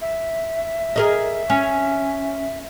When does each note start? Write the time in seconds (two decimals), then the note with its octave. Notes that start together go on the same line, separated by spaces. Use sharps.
0.01 E5
0.96 G#4 A#4 D#5
1.50 C#4